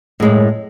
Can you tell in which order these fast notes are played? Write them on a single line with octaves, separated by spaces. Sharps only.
A2 G#3 F#2